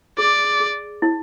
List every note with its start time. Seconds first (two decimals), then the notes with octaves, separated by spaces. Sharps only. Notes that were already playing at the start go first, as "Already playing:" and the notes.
0.18 G#4 D5
0.60 G#4
1.02 E4